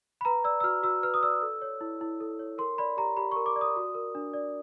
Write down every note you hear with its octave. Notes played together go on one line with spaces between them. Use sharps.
B5
B4 A#5
D5 E6
E6
F#4 F6
F#4 E6
B4 F6
D#6
D5 E6
A4
C#5
E4
E4
A4
C#5
A#4 C6
D5 B5
G4 A#5
G4 B5
A#4 C#6
D6
D5
D#6
F#4
A#4
D4
D5